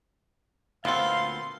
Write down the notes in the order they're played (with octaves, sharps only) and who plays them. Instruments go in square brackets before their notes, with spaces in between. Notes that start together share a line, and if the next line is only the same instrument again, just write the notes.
[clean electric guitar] D2 A#2 A4 [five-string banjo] B3 C4 [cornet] F5 [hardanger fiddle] C6